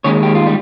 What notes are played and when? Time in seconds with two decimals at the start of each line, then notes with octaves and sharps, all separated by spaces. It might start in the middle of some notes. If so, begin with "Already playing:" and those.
0.04 D#2 D#3 G#3 C#4 C#5
0.23 G4
0.35 F4
0.46 G3